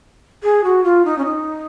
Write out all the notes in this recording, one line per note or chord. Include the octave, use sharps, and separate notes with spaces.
G#4
F#4
F4
D#4
C#4
D#4